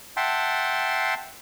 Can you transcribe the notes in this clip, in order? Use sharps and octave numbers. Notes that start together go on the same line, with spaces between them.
E5 F#5 G5 A5 C6